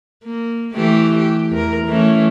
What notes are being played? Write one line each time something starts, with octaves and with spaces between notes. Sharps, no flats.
A#3
E3 A3 G4
G4
E2 A#4
E3 A3 C#4